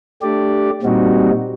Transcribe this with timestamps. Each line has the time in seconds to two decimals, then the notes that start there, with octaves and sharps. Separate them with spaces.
0.22 A3 D4 G4 D5
0.82 A#2 G3 C4 D#4 F#4